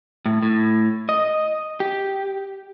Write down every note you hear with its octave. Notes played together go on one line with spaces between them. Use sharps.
A2
A2
D#5
G4